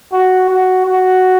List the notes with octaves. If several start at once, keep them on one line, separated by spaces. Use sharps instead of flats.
F#4
F#4
F#4